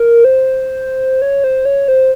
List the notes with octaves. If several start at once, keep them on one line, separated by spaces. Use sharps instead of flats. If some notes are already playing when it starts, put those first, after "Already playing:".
Already playing: A#4
C5
C#5
C5
C#5
C5